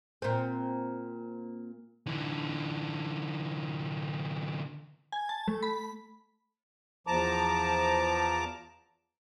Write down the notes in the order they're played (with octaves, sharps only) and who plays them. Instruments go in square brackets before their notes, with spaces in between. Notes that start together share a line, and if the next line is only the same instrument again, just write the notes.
[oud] A#2 C4
[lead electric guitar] D3 E3
[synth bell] G#5
A5
A3
B5
[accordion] E2 F3 A5 A#5 D6